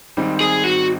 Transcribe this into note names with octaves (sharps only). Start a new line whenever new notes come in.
G#1 G#2 D#3 G3 C4
G#4
F#4